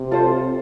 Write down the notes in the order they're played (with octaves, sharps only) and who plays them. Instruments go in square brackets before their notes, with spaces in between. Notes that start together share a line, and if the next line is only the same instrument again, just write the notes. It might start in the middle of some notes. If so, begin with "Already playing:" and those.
Already playing: [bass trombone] C3
[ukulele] F4 A4 C5